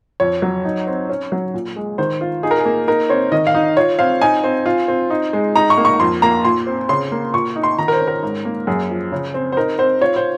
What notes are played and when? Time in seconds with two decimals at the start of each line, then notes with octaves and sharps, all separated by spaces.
0.20 F2 C#5
0.42 F#3
0.65 D#4
0.87 C4
1.09 C#4
1.32 F#3
1.54 A#2
1.76 G#3
1.98 D#3 C5
2.21 F4
2.43 D#4 G#4
2.51 A#4
2.59 G#4
2.65 A#3
2.88 D#4 A#4
3.09 C4 C#5
3.32 D#3 D#5
3.47 F5
3.55 D#4
3.77 F4 C#5
3.99 C4 F5
4.21 D#4 G#5
4.44 C4
4.66 F4
4.88 C4
5.10 D#4
5.33 G#3
5.56 D#4 A#5
5.70 C#6
5.77 A#3
5.85 C#6
6.00 F2 C6
6.22 A#3 A#5
6.45 A#2 C6
6.67 C4
6.89 C#3 C6
7.12 A#3
7.34 A#2 C#6
7.56 D#4
7.63 C6
7.79 D#3 A#5
7.88 A#4
7.93 C5
8.00 C#4
8.08 A#4
8.23 G#2
8.45 A#3
8.67 F#2 G#4
8.90 F3
9.12 C#3
9.34 C4
9.52 C5
9.57 D#4 A#4
9.78 C4 C5
10.01 F4 C#5
10.16 C5